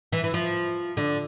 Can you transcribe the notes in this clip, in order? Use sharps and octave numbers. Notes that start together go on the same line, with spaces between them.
E3
E3
F3
D3